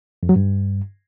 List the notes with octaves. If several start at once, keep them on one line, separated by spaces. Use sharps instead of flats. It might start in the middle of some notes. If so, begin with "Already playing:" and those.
F2
F#3
G2